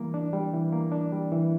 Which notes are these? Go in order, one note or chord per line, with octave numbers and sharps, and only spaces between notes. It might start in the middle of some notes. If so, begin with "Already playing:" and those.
Already playing: E3 G3 A#3
D4
G3
E3
A#3
D4
G3
E3